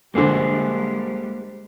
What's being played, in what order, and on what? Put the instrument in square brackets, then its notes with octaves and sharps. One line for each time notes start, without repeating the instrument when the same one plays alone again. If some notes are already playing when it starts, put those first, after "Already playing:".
[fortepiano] A#1 D3 [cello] G3 G#3 [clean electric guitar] A#3 G#4 C5